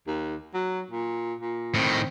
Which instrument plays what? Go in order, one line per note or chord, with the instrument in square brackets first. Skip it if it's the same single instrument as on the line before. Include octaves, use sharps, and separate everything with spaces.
[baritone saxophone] D#2
F#3
A#2
A#2
[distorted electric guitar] A2 D#3 [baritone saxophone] C4